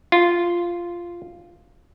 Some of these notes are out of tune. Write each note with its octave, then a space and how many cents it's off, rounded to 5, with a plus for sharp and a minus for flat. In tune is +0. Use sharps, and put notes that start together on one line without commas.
F4 -5